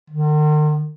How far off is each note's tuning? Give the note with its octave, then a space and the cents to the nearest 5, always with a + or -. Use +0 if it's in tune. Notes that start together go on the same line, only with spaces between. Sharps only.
D#3 -45